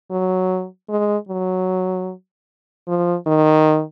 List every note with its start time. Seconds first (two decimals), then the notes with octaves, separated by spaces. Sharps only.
0.10 F#3
0.89 G#3
1.29 F#3
2.88 F3
3.27 D#3